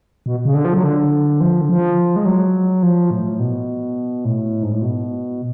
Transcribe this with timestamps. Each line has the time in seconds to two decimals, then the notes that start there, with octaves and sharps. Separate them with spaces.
0.26 B2
0.45 C#3
0.54 D3
0.65 F3
0.74 F#3
0.84 D3
1.41 F3
1.61 D3
1.69 F3
2.16 G#3
2.25 F#3
2.83 F3
3.11 A2
3.40 B2
4.25 A2
4.63 G#2
4.72 A2
4.82 B2